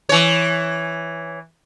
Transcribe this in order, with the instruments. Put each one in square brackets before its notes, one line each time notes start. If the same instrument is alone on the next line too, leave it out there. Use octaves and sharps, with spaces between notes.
[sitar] E3 C#5